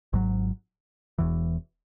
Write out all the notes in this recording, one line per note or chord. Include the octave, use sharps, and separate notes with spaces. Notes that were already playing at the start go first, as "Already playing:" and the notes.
G#1 G#2 F#3
E1 E2 E3